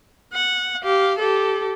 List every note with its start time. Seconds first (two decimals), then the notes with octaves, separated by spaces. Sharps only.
0.33 F#5
0.84 G4 F5
1.19 G4 A4